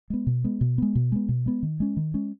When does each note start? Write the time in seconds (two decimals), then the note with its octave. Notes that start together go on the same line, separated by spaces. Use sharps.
0.10 G#3 B3
0.27 B2
0.44 G#3 B3
0.61 B2
0.78 G#3 B3
0.95 B2
1.12 G#3 B3
1.29 B2
1.46 G#3 B3
1.63 D#3
1.80 G#3 C#4
1.97 D#3
2.14 G#3 C#4